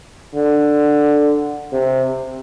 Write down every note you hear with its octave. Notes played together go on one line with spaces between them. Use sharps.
D3
C3